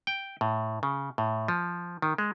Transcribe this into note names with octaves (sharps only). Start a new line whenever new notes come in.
G5
A2
C#3
A2
F3
D#3
G#3